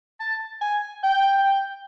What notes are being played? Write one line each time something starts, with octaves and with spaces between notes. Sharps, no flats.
A5
G#5
G5